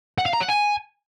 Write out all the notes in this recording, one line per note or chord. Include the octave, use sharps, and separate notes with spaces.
F#5
F5
A#5
F#5
G#5